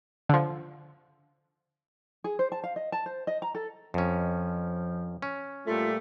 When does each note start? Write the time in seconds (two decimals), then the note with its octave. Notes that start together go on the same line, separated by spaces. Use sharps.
0.29 D3 F3
2.24 G#4
2.39 C5
2.52 A5
2.64 F5
2.76 D#5
2.92 A5
3.06 C5
3.27 D#5
3.42 A#5
3.55 A4
3.94 F2 F3 C#4
5.22 C#4
5.67 A#2 G3 A3 F4